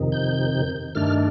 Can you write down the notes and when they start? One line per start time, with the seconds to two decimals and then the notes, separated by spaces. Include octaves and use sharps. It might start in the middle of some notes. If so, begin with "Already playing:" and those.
Already playing: F2 C3 D#3
0.12 G6
0.95 G2 D#3 A3 D4 F6